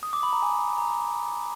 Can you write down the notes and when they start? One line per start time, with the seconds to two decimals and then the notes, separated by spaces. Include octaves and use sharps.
0.03 D#6
0.13 D6
0.23 B5
0.33 A#5
0.42 G#5
0.78 A#5